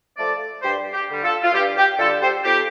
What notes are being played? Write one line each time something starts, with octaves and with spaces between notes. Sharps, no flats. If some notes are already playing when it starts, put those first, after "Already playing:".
F3 A3 A4 D5
G2 G4 C5
G4
D3 G3
F4 A4
F4
G2 G4
G4
D3 G3 F4 A4
G4 C5
F2 G4